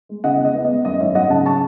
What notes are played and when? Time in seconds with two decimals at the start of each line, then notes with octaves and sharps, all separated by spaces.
0.09 G#3
0.24 C#3 D#5 F#5
0.39 E2
0.45 D#5
0.54 B3
0.65 D#5
0.70 G#3
0.85 F#2 D#5
1.00 G#1 C#5 E5
1.15 F#3 D#5 F#5
1.30 C#3 F#5 A5
1.46 A5 C#6